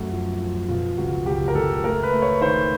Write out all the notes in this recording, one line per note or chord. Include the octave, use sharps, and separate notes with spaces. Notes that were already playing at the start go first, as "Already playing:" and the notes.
Already playing: F#2 A3 F#4
F3
F3
B2 F4
C#2 F#4
C#2 G4
A#4
C#2 A4
A3 A#4
B4
A3
C#5
D#3 C5